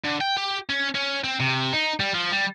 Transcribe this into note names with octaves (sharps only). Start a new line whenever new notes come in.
D3
G5
G4
C#4
C#4
C4
C3
D#4
G3
F3
G3